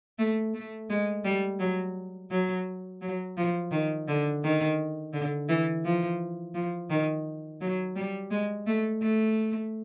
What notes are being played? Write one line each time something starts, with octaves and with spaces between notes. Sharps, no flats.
A3
A3
G#3
G3
F#3
F#3
F#3
F3
D#3
D3
D#3
D3
E3
F3
F3
D#3
F#3
G3
G#3
A3
A3